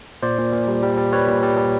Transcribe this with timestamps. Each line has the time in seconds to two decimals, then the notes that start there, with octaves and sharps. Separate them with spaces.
0.23 A#2 C5 D5
0.38 A#2
0.53 A#2
0.68 G3
0.83 G3
0.97 G3
1.13 G3 B4 C#5
1.28 A#2
1.43 G3
1.58 G3